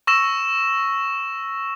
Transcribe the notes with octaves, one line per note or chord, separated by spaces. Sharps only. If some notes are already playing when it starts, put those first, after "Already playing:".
C#6 E6 A#6 E7